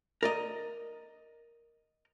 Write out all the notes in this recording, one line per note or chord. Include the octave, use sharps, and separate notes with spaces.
A#4 D5 D#5